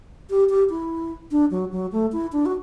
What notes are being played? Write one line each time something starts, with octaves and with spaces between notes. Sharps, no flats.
G4
G4
E4
D4
F#3
F#3
A3
E4
D4
F#4